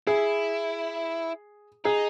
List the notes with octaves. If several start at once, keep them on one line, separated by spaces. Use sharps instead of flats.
E4 G#4
D#4 G#4